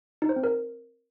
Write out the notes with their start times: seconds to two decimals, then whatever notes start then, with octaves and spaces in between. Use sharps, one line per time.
0.22 D#4
0.29 C5
0.36 C4
0.44 A#4